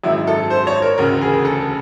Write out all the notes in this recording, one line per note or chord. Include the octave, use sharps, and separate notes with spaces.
G#1 F#2 D#3 G#3 E4
A4
C5
C#5
A#4
E1 D2 C#3 A#4
G#4
A4